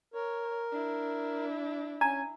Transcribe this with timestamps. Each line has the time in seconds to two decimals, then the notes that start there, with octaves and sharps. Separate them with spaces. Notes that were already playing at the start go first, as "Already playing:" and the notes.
0.14 A#4 C#5
0.72 D4 E4
2.01 C#4 G#5 A#5